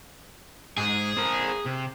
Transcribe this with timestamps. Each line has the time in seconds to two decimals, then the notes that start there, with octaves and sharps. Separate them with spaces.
0.78 G#2 G#4
1.17 C4 A#4
1.66 C3